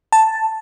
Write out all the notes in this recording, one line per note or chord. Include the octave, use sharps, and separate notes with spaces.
A5